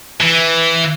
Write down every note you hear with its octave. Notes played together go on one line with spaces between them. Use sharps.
E3